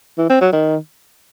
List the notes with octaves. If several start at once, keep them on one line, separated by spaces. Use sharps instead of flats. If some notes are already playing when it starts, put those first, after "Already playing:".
E3
C4
F#3
D#3